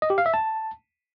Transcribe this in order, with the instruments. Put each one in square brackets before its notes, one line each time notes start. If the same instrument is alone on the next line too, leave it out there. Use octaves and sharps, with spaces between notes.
[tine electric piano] D#5
G4
F5
E5
A5